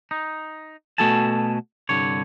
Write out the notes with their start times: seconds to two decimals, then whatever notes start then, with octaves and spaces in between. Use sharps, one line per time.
0.11 D#4
0.98 B2 A3 F#4 A4 G#5 A5
1.89 C2 G2 D3 C#5